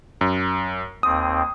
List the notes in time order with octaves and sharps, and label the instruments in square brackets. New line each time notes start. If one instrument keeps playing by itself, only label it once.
[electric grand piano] F#2
[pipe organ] D#2 C4 [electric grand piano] D#6